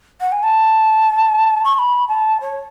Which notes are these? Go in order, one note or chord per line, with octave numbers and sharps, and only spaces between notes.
F#5
G#5
A5
C#6
C#6
B5
A5
C#5